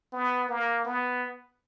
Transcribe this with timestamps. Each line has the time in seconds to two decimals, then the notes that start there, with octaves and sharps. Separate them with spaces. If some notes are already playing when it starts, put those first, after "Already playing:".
0.13 B3
0.49 A#3
0.85 B3